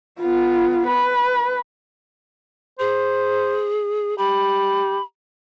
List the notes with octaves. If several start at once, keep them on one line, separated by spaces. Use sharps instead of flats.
B3 F4
B4
G#4 C5
G4 B5